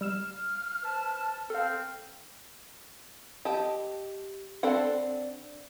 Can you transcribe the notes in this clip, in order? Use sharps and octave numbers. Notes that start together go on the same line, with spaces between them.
G3 E6 F6 E7
B4 C5 A5
C4 A4 F5 F6
G4 D#5 A5
C4 D4 A4 F#5